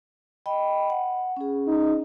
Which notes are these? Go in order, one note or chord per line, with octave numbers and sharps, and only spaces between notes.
D#5 G5 B5
F#5
C#4 G#4
D#4